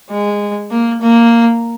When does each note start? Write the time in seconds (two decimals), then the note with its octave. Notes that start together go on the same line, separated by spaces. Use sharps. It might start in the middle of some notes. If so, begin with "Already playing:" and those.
0.10 G#3
0.71 A#3
1.01 A#3